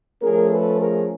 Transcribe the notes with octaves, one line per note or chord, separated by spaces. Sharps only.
F3 A3 C#4 G#4 A#4
A4 B4
G#4 A#4